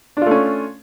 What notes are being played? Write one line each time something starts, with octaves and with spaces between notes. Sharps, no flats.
A3 C#4 D4 F4